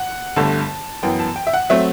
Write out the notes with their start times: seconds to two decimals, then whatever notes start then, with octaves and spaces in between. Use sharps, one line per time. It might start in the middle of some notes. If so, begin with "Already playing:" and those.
Already playing: F#5
0.36 G1 G2 D3 A3 A5
1.03 F#2 E3 B3 G5
1.19 A5
1.36 G5
1.47 E5
1.53 F#5
1.70 F#3 A3 C4 E5